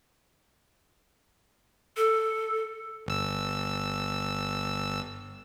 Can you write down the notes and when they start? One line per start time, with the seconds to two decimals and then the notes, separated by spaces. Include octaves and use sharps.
1.97 A4
3.07 G1 E6